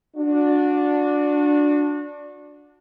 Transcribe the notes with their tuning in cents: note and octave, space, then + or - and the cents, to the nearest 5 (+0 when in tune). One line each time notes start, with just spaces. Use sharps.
D4 +0 F#4 -30